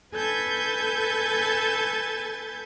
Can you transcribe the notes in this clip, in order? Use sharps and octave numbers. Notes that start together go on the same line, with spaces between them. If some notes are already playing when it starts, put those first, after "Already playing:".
A4 B4 G#5 G6 A6